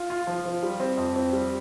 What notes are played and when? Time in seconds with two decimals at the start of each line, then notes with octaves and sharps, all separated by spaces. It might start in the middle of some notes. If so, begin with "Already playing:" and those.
Already playing: F4
0.10 F4
0.27 F3
0.45 F3
0.63 G3
0.80 C4
0.97 F2
1.16 C4
1.33 G3